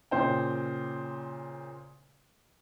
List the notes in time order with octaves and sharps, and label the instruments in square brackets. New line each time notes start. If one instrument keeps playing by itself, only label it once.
[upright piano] A#2 C#3 C5 D5 G5